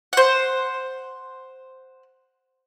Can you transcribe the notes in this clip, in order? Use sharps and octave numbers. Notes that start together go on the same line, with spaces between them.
C5 F#5